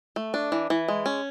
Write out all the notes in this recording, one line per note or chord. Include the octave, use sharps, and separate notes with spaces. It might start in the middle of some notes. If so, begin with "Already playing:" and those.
A3
D4
E3
E3
G#3
C#4